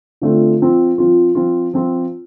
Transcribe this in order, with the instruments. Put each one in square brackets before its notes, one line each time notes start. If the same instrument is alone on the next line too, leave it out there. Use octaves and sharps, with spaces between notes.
[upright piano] D3 A3 C4 F4
F3 C4 F4
F3 C4 F4
F3 C4 F4
F3 C4 F4